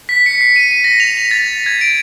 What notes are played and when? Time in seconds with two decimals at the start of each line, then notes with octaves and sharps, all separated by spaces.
0.09 B6
0.26 C#7
0.41 C7
0.56 D#7
0.71 D#7
0.84 A#6
1.00 F7
1.17 F7
1.31 A6
1.66 G#6
1.81 D7